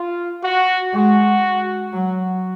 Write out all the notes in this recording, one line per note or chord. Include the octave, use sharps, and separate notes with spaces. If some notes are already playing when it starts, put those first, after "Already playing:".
Already playing: F4
F#4
G#3 F#4
F#3 F#4